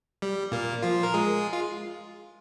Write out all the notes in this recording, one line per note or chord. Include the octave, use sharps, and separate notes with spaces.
G3
A#2 A#3
F3 F4
A#4
G#3 G#4
F4